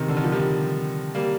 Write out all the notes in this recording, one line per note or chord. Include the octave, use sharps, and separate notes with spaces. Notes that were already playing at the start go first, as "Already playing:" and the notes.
Already playing: C3 D#3
D3
D#3
F3
D#3 G3
G3 A#3